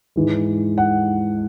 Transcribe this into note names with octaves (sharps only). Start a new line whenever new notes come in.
G#2 E3 G#3
F#5